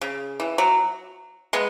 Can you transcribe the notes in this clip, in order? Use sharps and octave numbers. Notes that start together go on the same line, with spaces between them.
C#3
E3
F#3
G#3 B3